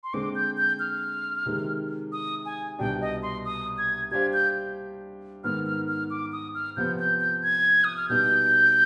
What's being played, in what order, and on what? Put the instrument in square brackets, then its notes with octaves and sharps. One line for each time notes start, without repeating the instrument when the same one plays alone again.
[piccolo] C6
[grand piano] D3 G#3 C4 [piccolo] D6
[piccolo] G6
G6
F6
[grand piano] C3 D#3 G#3
[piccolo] D#6
G#5
[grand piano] C2 B2 G3 D4 [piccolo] G5
[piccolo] D#5
C6
D#6
G#6
[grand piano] G3 D4 G4 C5 F5 [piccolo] G#6
[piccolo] G6
[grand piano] G#2 D#3 B3 [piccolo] F6
[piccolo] F6
F6
D6
D#6
F6
[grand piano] C3 F3 B3 [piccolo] G6
[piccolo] G6
G6
G#6
D#6
F6
[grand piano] B2 G3 B3 D#4 [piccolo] G6